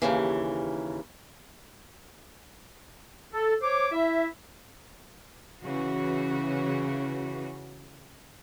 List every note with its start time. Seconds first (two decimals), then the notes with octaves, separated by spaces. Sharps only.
0.02 D#2 A2 C#3 E3
3.32 A4
3.61 C5 C#5 D6
3.91 E4 E5
5.63 C#3 E3 F#4